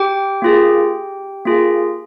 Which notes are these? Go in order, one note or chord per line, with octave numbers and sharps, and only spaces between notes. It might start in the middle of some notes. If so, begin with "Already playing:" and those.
Already playing: G4 G5
A#3 F4 G#4
A#3 F4 G#4